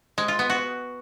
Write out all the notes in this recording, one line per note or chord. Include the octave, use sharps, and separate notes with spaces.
G#3
F4
B3
F#4